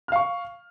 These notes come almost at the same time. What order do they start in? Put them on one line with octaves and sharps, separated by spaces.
F6 F5 C#6